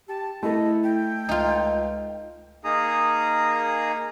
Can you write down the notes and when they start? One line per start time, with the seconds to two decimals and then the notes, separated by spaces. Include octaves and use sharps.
0.09 G4 A5
0.43 A3 E4 A4 D#5
0.83 G5
1.29 C#2 D#4 F4
2.64 A#3 D#4 G#4 A#5 D#6